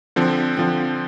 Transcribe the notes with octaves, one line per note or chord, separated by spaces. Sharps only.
D3 F3 C4
D3 F3 C4